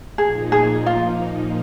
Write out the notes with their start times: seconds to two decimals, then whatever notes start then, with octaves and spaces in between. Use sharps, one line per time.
0.18 A#2 F3 A#3 D#4 G#4
0.52 G#4
0.86 F4